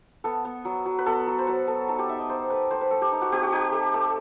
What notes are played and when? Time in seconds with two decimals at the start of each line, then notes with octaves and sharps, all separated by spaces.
0.24 B3 A4
0.45 B3
0.65 F#3
0.86 F#3
0.99 B4
1.06 B3 A4
1.27 F#3
1.39 C5
1.47 F#3 B4
1.67 B3 A4
1.88 D#4 A4
1.99 G4
2.09 D#4 E5
2.19 D#5
2.29 D#4 C5
2.50 A3 B4
2.71 A3 C5
2.81 B4
2.91 A3 A4
3.02 G4
3.12 D#4
3.22 F#4
3.32 C4 G4
3.43 F#4
3.52 D#4 G4
3.73 A3
3.94 A3